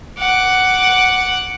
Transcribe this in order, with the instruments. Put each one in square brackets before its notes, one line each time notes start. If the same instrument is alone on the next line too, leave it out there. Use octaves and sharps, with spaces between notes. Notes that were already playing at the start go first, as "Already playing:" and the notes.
[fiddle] F#5 D6